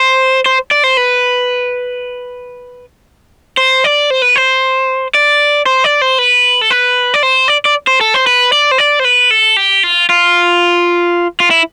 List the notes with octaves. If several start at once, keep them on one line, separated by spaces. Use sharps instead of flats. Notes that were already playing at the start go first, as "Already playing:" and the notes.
Already playing: C5
C5
D5
C5
B4
C5
D5
C5
B4
C5
D5
C5
D5
C5
B4
A4
B4
D5
C5
D5
D5
C5
A4
C5
B4
D5
C5
D5
C5
B4
A4
G4
F4
F4
F4
E4